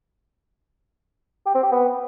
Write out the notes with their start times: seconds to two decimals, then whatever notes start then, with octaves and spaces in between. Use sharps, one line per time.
1.46 G4
1.55 C4
1.63 G4
1.72 B3